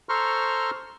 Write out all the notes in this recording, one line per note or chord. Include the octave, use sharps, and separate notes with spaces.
A4 C5 A#5 C6 C#6 F6